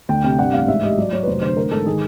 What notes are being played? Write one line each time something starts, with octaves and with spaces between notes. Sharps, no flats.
D2 G5
C3 G5
G2 F#5
A1 F5
G#2 E5
G3 D#5
F#3 D5
F#3 C#5
B4
F1 C5
D3 C5
A1 A#4
G#2 A4
D#3 G#4